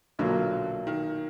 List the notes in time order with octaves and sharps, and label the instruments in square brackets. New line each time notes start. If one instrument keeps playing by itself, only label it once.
[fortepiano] B1 A#2 F#3 A#3 [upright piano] D3
[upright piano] D#3